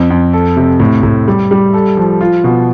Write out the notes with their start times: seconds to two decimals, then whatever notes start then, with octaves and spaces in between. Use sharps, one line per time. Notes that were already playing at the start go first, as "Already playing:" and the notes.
Already playing: F2
0.10 F2
0.33 A4
0.57 C3
0.80 A2
1.03 A2
1.27 G3
1.51 G3
1.74 A4
1.97 F3
2.21 F4
2.44 B2